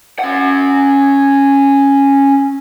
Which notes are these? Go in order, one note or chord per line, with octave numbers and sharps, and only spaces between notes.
C#4 F#5